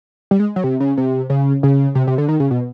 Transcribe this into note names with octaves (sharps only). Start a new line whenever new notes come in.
G3
G#3
F#3
C3
C#3
C3
C#3
C#3
C3
C3
D3
D#3
C#3
B2